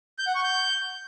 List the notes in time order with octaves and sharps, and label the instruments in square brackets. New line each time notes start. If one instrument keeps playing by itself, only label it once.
[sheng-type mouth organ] G6
F#5
C#6
G6